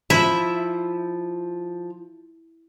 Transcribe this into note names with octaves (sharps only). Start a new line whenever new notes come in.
F3 E4 E5